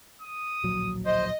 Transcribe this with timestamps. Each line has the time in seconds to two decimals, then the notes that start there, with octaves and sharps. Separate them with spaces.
0.22 D#6
0.63 D1 A#1 F#3
1.06 C5 D#5